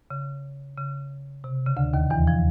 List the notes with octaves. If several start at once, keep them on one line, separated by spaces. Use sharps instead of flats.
C#3
C#3
C3
C#3
D2 D3
D#2 D#3
E2 E3
F3